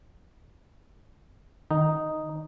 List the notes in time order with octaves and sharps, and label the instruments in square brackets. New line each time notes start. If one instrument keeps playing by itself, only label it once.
[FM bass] D#3 [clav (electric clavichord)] D#4